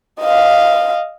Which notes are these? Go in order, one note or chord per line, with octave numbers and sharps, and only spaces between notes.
D#5 F5